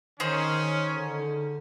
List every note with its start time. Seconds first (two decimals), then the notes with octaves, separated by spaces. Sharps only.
0.20 D#3 C#4 D#4 G#4 C5
0.92 D3